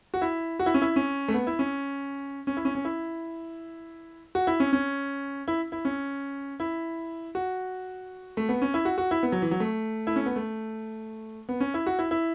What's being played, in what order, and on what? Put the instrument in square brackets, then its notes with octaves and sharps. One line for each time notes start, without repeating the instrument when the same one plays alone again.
[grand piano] F#4
E4
F#4
E4
C#4
E4
C#4
A3
B3
E4
C#4
C#4
E4
C#4
C#4
E4
F#4
E4
C#4
C#4
E4
E4
C#4
E4
F#4
A3
B3
C#4
E4
F#4
F#4
E4
B3
F#3
E3
F#3
A3
E4
C#4
B3
A3
B3
C#4
E4
F#4
E4
E4